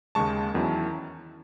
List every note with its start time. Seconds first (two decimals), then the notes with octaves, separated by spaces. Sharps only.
0.15 D#2 C#3 G#3 A5 C#6
0.54 E2 D#3 F#3 C#4 E4